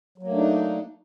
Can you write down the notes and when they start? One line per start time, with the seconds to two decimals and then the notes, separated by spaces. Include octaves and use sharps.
0.18 F#3
0.23 A#3
0.28 A3
0.32 D4
0.37 D#4